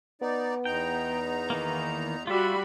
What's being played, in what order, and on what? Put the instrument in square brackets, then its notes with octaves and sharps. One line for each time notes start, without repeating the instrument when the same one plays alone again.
[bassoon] B3 [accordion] D#4 D5
[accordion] E2 D#4 A#5 [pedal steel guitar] G5
[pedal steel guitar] D#3 E3 A#3
[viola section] G3 F#4 B5 [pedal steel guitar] F4 E5